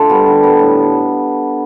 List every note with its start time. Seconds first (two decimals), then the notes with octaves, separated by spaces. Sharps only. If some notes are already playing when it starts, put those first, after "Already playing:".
Already playing: D3 A3 D4 F4 A4
0.09 G3 B3
0.27 D3
0.43 G3 B3
0.60 A2